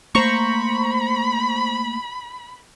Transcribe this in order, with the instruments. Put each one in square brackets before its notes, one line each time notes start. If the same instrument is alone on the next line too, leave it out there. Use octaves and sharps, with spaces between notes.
[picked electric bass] A3 A#3 [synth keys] C5 A#5 C#6 [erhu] B5